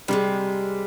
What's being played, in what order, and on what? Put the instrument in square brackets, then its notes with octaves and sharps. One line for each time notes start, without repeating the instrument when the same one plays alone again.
[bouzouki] C3 D#3 G#3 [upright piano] G3